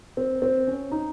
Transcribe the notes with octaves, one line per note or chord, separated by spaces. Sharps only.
C4
C4
C#4
D#4